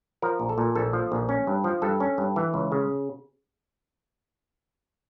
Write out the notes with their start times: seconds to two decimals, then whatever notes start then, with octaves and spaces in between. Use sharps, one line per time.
0.22 F3 A#4
0.40 A#1
0.49 A4
0.58 A#2
0.75 A#1 A4
0.93 F3
1.12 A#1
1.29 C#4
1.47 G2
1.64 F3
1.82 G2 A4
2.00 C#4
2.18 G2
2.36 E3
2.54 C#2
2.72 C#3